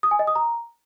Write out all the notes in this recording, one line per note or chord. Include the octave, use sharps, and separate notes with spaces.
D#6
G#5
D#5
D#6
A#5